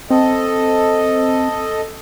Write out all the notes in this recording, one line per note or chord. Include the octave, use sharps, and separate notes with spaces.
C4 A4 D#5